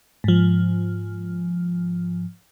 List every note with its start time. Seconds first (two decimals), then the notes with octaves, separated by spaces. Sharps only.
0.24 G#2 F3